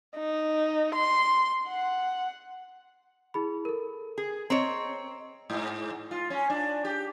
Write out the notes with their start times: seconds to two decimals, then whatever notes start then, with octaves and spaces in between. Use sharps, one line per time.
0.17 D#4
0.95 C6
1.68 F#5
3.34 E4 G#4 B5
3.65 A4 A#4
4.18 G#4
4.50 C4 C#5 D#5 A#5
5.50 G#2
6.11 F4
6.30 C#4
6.50 D4
6.85 G4